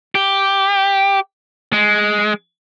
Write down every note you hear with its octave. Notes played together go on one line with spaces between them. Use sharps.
G4
G#3